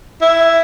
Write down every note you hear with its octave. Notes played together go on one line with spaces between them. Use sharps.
E4